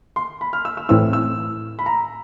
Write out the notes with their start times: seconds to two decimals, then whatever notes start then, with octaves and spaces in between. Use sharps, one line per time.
0.16 C6
0.41 B5
0.53 F6
0.65 E6
0.77 E6
0.89 A2 E3 A3 C4 E4 E6
1.13 E6
1.79 B5
1.86 A#5